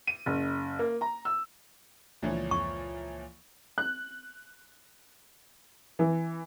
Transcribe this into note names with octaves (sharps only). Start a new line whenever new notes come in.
D#7
F#1
A#3
A#5
E6
C#2 A#2 D3 E3 F3 A3 D4 C#5
F2 C#6
F#6
E3